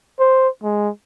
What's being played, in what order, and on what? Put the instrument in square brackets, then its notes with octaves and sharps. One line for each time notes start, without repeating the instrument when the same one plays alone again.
[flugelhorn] C5
G#3